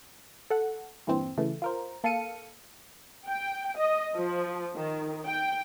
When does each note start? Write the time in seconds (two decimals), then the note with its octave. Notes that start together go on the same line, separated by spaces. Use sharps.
0.50 A4 F#5
1.07 G2 A#2 E3 C4
1.37 C#3 E3 A3
1.62 F4 A#4 C5
2.04 A#3 A4 F5 C#7 D#7
3.27 G5
3.78 D#5
4.14 F3
4.75 D#3
5.26 G5